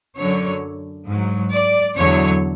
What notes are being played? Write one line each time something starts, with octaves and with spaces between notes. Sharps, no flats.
F#2 D3 F#3 C#5
G#2
F#3
D5
E2 D3 F#3 C#5